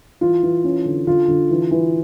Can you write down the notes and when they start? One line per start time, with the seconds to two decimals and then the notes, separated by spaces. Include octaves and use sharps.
0.21 E3 F4
0.43 E3
0.64 C#4
0.85 D3
1.07 D3 F4
1.28 D3
1.50 E3
1.71 E3